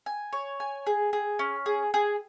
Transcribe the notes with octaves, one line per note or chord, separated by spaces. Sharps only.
G#5
C#5
G#5
G#4
G#4
C#4
G#4
G#4